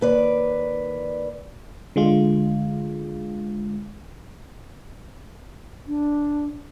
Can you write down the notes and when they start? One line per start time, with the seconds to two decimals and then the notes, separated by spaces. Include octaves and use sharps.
0.01 D#2 B4 D5
1.96 D3 G#3 F4
5.87 D4